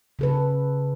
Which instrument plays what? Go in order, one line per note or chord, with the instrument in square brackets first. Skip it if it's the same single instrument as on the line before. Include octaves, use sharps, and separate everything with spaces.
[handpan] C#3 A4 B4